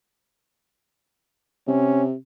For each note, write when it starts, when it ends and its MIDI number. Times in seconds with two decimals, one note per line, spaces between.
1.68 2.14 48
1.68 2.04 61